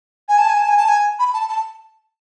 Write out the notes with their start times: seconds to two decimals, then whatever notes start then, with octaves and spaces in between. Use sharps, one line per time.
0.28 G#5
0.38 A5
0.48 G#5
0.58 A5
0.68 G#5
0.77 A5
0.88 G#5
1.19 B5
1.33 A5
1.49 A5